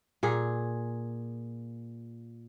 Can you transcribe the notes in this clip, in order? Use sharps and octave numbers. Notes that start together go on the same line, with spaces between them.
A#2 G#4